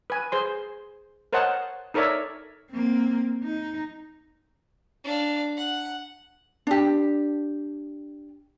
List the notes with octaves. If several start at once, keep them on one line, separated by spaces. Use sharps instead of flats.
B4 G#5
G#4 C5 C6
A#4 C5 C#5 D#5 F#5 A5
D#4 A4 A#4 C#5 D5 E5
A#3 C4
D#4
D4 F5
F#5
D4 G4